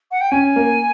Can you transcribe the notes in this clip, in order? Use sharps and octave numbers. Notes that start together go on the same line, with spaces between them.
F#5
G5
C#4 G#5
A#3